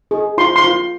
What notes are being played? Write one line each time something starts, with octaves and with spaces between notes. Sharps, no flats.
G#4
F4 C6
C6
F4